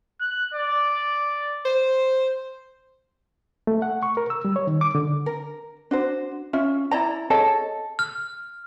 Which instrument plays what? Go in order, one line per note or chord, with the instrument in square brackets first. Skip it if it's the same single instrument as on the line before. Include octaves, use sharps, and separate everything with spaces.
[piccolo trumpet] F#6
D5
[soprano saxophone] C5
[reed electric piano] A3
F#5
C#6
A#4
E6
G3
C#5
D#3
D6
D3
[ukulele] A#4
D4 F#4 C5
C#4 F4 E5
E4 D5 A#5
G#4 A4 C#5 D#5
[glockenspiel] F6